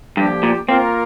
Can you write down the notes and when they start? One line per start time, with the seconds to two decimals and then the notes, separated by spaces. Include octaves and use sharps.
0.17 G2 D3 F3 A#3 G4
0.43 A#2
0.68 A#3 C4 F4 A#4